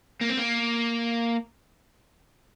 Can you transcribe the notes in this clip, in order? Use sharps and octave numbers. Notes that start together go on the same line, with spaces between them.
A#3
C4
A#3